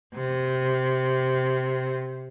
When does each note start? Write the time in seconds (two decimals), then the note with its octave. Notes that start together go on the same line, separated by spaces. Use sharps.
0.15 C3